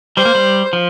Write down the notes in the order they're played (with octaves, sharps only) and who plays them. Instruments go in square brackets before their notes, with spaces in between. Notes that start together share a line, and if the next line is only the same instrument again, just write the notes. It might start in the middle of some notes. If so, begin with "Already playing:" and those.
[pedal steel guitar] G3 [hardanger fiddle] C5
[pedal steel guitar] A#3
G3
F3